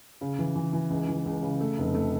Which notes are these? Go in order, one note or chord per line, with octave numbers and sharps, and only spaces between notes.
C#3
E3
E3
E3
C#2
E3
C#2
C#3
A3
F1
A3